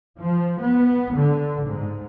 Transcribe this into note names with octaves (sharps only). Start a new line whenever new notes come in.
F3
B3
D3
G#2